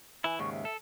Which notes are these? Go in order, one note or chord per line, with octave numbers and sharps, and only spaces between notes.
E3 E4 G#5
D#2 G#2 C#3 C#6
E5
A4